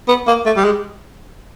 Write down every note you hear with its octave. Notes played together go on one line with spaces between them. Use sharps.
B3
A#3
A3
G3
G#3